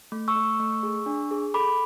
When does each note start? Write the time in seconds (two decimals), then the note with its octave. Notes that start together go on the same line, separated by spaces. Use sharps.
0.12 A3
0.28 C#6 E6
0.36 A3
0.60 A3
0.83 G#4
1.06 D4
1.31 G#4
1.54 A4 B5 D6